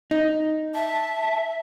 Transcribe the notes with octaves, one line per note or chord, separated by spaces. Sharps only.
D#4
E5 A5